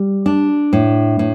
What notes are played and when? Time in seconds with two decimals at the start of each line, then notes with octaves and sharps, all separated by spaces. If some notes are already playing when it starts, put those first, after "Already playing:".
Already playing: G3
0.26 D4
0.73 A2
1.19 A2